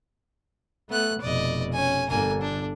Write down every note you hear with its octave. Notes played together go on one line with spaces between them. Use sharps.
A3 B3 F#6
F1 B2 D5 D#5
C#4 G#5
G1 D3 A#3 G#5
D4